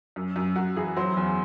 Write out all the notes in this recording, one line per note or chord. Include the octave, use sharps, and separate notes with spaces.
F#2
F#2
F#2 F#4
E3 G#4
F#3 C5
E2